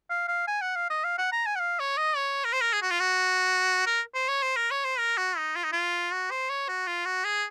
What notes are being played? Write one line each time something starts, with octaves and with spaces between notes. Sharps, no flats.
F5
F5
G#5
F#5
F5
D#5
F5
F#5
A#5
G#5
F#5
F5
C#5
D#5
C#5
A#4
C5
A#4
G#4
F#4
F4
F#4
A#4
C5
C#5
C5
A#4
C#5
C5
A#4
F#4
D#4
F4
D#4
F4
F#4
C5
C#5
F#4
F4
F#4
G#4